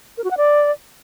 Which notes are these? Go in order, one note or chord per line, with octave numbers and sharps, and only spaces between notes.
A#4
F#4
F#5
D5